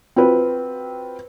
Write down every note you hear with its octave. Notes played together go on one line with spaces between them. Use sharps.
C4 F4 F#4 B4